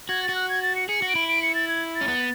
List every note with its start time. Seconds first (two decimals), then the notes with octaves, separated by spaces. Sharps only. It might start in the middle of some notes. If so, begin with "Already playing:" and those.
0.09 F#4 G#6
0.23 A6
0.29 F#4
0.35 F#6
0.49 G#6
0.63 A6
0.76 C#7
0.89 G#4 C#7
1.02 F#4
1.09 D7
1.15 E4
1.28 D7
1.42 C#7
1.55 A6
1.68 G#6
1.95 A6
2.01 C#4
2.08 B3